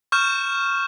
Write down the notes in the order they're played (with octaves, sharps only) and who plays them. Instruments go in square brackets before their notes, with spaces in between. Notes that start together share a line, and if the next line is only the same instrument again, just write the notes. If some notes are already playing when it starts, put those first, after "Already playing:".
[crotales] C#6 F6 G6 E7